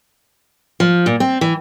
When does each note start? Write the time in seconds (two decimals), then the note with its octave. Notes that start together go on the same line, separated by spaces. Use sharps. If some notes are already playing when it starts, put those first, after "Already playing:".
0.80 F3
1.06 A#2
1.20 C4
1.41 E3